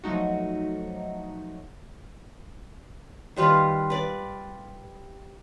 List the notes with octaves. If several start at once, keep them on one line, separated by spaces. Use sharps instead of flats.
F3 F#3 A3 D#4 F#4
D#3 G3 F4 B4
B4 D5